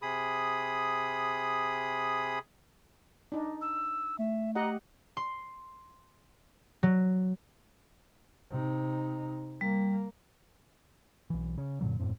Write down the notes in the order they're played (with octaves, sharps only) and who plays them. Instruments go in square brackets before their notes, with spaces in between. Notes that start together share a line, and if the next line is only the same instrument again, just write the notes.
[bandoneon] C3 G#4 B5 D#6
[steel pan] D4 D#4
[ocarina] E6
[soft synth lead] A3 [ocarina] E5
[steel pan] G4 D#5 F#5 [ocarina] A#5
[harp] C6
F#3
[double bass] C3 D#4
[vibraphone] G3 [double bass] A#3
[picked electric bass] B1 E3
C#3
F#2 A#2 D3 F#3
E1 F#2 A2 C4